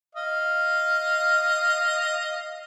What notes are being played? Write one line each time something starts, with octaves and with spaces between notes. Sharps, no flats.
D#5 F5